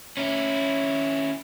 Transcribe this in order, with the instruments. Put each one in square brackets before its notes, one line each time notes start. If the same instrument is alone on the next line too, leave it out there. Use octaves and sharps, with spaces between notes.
[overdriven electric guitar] C#4 E4